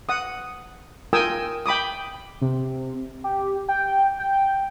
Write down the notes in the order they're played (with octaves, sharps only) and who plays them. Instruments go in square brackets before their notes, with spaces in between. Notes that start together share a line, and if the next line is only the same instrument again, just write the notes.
[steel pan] F#5 D#6
F4 A#4 G5 G#5 D#6 E6
G5 B5 D6 D#6
[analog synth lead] C3
G4
G5
G5